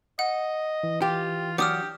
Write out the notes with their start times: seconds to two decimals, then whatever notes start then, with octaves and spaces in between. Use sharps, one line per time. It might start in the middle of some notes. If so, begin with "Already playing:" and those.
0.19 D#5 F#5
0.83 E3
1.02 F4 G4
1.58 F#3 D4 G4 D6 D#6 F6